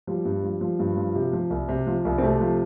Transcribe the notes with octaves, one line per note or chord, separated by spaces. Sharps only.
F3 G3
G2
F3
F3
G2
F3
C3
F3
C2
C3
F3
C2
C4
C3 A3
F3